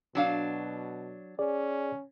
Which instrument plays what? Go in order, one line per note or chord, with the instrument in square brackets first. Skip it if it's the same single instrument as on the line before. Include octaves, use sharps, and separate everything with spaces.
[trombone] B2 [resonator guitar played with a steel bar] F#3 D4 F5
[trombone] C#4 [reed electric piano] G#4 D5